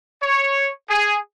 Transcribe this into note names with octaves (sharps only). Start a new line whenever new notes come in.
C#5
G#4